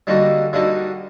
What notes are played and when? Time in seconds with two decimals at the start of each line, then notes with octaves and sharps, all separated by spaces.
0.07 D3 G3 A#3 D#4 F#4
0.53 D3 G3 A#3 D#4 F#4